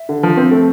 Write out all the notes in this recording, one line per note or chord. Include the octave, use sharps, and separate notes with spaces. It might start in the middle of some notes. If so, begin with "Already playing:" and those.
Already playing: E5
D3
F3
C4
A3